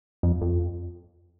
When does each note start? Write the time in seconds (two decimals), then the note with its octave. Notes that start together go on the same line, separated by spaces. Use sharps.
0.23 F2
0.41 F2